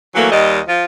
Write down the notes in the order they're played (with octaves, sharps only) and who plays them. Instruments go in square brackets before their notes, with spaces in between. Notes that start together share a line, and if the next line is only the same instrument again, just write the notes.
[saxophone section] E3 F#3 A3 A#3
D#2 G3 D#5
F3 F4